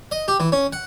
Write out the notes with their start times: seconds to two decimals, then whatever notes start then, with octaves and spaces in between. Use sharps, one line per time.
0.11 D#5
0.28 G4
0.40 E3
0.52 C#4
0.73 F#5